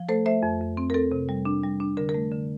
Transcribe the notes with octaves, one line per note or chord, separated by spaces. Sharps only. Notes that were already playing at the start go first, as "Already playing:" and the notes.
Already playing: F3
A3 A4 C5
A3 C5 E5
F2
F2
C4
A#4
C4 A4
C3
G3
D4
G3
D4
D3 A#4
A#4
A3
D3